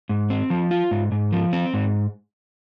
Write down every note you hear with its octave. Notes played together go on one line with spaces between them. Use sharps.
G#2
C4
F3
F4
G#2
G#2
F3
C4
G#2